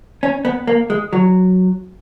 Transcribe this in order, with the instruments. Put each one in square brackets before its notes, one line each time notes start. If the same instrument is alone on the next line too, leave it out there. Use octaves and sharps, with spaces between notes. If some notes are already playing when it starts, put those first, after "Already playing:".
[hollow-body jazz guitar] C#4
B3
A#3
G#3
F#3